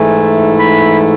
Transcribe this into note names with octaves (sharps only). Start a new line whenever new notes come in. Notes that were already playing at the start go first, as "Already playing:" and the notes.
Already playing: G#2 E3 A3 E4 G#5
B5